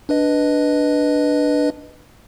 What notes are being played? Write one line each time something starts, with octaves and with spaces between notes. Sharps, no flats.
D4 B4 D#5